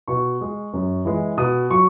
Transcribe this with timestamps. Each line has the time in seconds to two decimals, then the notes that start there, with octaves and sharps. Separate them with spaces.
0.08 B2 C#6
0.41 G#3
0.73 F#2
1.05 E3 G#3
1.37 B2 D#6
1.70 F#3 C#6